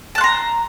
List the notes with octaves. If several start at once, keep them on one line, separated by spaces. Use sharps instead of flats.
A5 A#5 C6 F#6